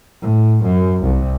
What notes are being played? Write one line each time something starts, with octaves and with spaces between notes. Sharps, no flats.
A2
F#2
C2